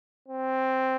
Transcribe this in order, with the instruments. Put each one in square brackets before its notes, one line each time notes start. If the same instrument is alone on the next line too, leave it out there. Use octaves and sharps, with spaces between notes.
[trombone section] C4